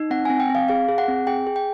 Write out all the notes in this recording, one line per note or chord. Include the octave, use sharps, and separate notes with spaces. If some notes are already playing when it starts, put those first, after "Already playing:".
Already playing: D#4
C4 F#5
C4 G#5
G5
C4
F5
G#4 F5
G#4
F#5
C4
G#4 G5
G#4
G5